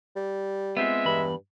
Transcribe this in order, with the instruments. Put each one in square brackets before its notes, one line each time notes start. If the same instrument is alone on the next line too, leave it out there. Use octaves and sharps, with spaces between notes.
[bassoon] G3
[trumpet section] G#3 E5 [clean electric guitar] B3 C4 F4
[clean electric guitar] E2 B5 [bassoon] G2